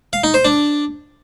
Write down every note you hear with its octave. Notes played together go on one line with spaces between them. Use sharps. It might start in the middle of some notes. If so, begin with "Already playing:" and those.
F5
D#4
C5
D4